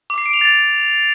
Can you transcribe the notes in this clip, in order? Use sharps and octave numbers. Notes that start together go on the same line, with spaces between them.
D6
C7
D7
F7
A6